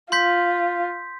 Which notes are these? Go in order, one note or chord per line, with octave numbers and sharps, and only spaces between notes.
F4 C6 G6 B6